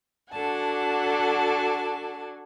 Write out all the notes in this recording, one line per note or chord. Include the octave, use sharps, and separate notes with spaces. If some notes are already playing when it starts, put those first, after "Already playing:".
D4 F#4 A4 F#5 G#5 A5